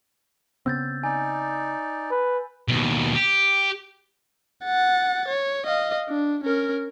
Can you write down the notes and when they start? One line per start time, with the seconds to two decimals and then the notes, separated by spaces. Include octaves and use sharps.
0.66 C#3 B3 C4 E6 G6 A6
1.03 D#4 D5 G#5
2.11 B4
2.68 D#2 B2
3.15 G4
4.65 F#5 A6
5.28 C#5
5.66 D#5 F5
6.09 D4
6.44 C#4 A#4